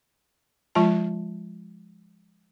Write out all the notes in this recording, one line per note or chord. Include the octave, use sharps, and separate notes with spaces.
F3 G#3 F4 A5